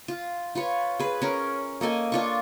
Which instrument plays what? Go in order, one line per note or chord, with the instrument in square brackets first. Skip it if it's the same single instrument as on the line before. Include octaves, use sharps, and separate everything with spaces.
[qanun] F4
F4 B4 C#5
G#4 B4
C#4 A#4
A#3 A4 D#5 G#5
D4 F4 C#6